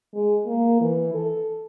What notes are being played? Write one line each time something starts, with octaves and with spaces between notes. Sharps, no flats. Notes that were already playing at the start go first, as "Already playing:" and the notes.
G#3
A#3
E3
A4